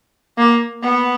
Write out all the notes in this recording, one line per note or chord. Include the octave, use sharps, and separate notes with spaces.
A#3
B3